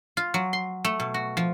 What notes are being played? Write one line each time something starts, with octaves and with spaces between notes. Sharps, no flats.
F4
F#3
C6
A3
B2
F#4
F3